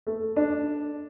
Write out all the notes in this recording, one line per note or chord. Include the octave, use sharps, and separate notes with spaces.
A3
D4